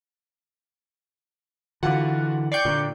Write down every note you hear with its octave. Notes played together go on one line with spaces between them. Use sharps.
D3 E3 F4 F#4 F#5
D5 G5 C#6 G6 C7
A#2 D3